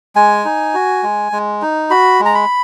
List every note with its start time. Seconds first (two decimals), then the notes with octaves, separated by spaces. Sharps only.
0.16 G#3 G#5
0.45 D#4
0.74 F#4
1.03 G#3
1.32 G#3
1.62 D#4
1.90 F#4 B5
2.20 G#3
2.25 A#5
2.35 B5